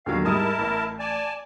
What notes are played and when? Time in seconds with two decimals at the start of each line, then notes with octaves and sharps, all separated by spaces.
0.06 D#2 D3 F#3 F5
0.24 G#2 G3 E4 A#4 A5 D#6
0.59 A1
0.99 D5 G#5 A5